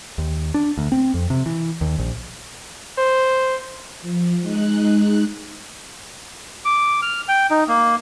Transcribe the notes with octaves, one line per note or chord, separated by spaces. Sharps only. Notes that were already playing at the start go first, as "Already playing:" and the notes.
D#2
D4
D2
C4
F2
C3
E3
D#2
A#1
C5
F3
G#3 D#4 F#6
D6
F6
G5
D#4
A#3